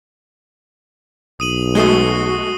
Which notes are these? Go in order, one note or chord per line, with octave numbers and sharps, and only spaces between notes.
B1 D#6 D#7 F#7
G#3 A3 F#4 D#6 C7 G7